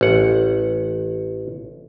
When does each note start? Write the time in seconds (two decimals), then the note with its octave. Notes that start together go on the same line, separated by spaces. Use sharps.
0.01 A1 F#5